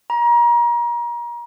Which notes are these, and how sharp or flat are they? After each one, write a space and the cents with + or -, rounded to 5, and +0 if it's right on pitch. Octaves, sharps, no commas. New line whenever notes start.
A#5 +30